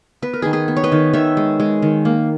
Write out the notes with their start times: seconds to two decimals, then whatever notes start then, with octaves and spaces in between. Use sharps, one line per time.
0.22 B3 B4
0.33 A#4
0.42 D#3 G#4 B4
0.53 G#4 B4
0.68 B3
0.76 C#5
0.84 B4 D#5
0.92 D#3
1.13 D#3 C#5 E5
1.37 G#3
1.60 G#3
1.82 D#3
2.05 A#3